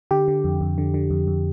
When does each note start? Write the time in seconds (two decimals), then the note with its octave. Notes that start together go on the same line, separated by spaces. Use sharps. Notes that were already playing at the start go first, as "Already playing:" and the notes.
0.11 D3 G4
0.28 D3
0.44 F2
0.61 F2
0.78 D3
0.94 D3
1.10 F2
1.27 F2